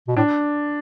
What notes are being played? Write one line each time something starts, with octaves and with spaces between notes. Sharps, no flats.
B2
A2 D4